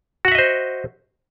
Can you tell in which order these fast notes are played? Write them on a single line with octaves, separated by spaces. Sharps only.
F#4 F#5 E5 D#5 C5